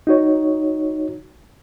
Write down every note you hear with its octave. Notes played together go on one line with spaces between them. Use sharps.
D#4 F#4 C#5